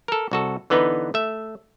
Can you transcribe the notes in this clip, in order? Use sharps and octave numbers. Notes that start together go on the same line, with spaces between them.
A4 A#4
C2 F#4 A4
D3 E3 B3 D#4 B4
A3 E5